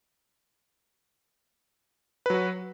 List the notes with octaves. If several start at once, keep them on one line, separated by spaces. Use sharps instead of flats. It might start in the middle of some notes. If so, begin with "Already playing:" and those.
F#3 F#4 B4